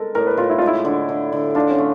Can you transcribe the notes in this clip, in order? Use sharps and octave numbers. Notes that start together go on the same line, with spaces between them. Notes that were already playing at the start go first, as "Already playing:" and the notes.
Already playing: G#3 A4 A#4
A2 A#4
B4
A2 F4
E4
G#3 F4
E4
D3
D3
D3
D4 F4
C#4
A3